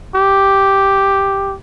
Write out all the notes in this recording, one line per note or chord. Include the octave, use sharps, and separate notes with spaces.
G4